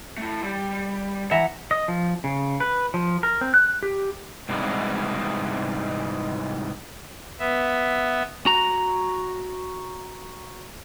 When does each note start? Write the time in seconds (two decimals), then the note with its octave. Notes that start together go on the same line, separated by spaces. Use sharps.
0.18 A3 E4
0.43 G3
1.31 E3 E5 F#5 A#5
1.71 D#5
1.88 F3
2.24 C#3
2.60 B4
2.94 F3
3.23 A#4
3.41 C4
3.54 F#6
3.83 G4
4.49 G#2 C3 E3 G3 G#3 B3
7.39 B3 E5
8.46 F#4 A#5